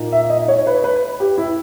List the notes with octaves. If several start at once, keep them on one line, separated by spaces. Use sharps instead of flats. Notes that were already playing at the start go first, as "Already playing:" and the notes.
Already playing: A#2 A#3 D#4
E5
D#5
C#5
B4
B4
G4
E4